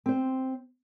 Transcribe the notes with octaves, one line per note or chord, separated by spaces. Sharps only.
C4 C5